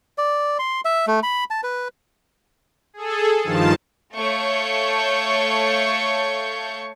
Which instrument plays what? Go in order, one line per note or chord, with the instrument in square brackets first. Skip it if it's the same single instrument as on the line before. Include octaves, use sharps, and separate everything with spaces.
[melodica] D5
C6
E5
A3
B5
A5
B4
[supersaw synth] G#4 A4
G2 D#3 F3 F4 A5
[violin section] A3 C#5 F5 A5 C#6 G6